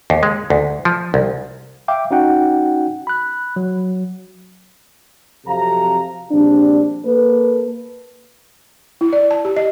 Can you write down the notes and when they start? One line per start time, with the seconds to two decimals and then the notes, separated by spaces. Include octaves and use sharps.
0.10 D#2
0.23 G#3
0.50 D2
0.85 F3
1.14 C2
1.88 E5 F5 G5 D6
2.11 C#4 D#4 F#4 F#5 G5
3.07 B5 F#6
3.56 F#3
5.47 F2 C3 F#3 A4 F5 A#5
6.31 A#1 G3 C4 D4
7.04 A#3 A4 B4
9.01 E4
9.13 D5
9.31 A5
9.45 G4
9.57 D#5